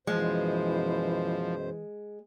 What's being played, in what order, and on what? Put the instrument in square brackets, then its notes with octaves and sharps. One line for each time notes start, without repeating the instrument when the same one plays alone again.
[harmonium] F#2 B2 C5 [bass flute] E3 [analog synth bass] F3 [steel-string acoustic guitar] G#3